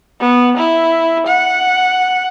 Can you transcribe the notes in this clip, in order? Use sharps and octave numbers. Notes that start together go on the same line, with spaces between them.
B3
E4
F#5